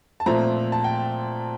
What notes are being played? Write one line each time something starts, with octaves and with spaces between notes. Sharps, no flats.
A5
A#2 F3 A3 C4 A#5
A5
G5